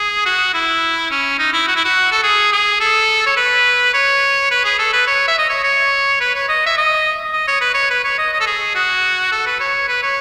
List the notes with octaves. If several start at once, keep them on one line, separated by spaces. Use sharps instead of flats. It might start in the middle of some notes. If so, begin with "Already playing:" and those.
Already playing: G#4
F#4
E4
C#4
D#4
E4
F#4
E4
F#4
A4
G#4
G#4
A4
C#5
B4
C#5
B4
G#4
A4
B4
C#5
E5
D#5
C#5
C#5
B4
C#5
D#5
E5
D#5
D#5
C#5
B4
C#5
B4
C#5
D#5
D#5
A4
G#4
F#4
A4
B4
C#5
B4
C#5